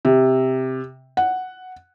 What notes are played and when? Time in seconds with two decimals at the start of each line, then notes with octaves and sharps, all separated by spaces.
0.05 C3
1.17 F#5